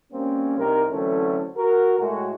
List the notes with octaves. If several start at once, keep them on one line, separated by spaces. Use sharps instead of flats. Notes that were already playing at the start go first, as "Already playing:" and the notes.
G3 A#3 C4 C#4
C2 C3 D#4 A#4
D3 E3 F#3 A3 C4 C#4
F#4 A#4
A2 G#3 F#4